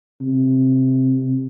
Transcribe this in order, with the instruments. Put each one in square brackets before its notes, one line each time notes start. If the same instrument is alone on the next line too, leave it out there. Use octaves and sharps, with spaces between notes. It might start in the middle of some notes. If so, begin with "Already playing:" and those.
[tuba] C3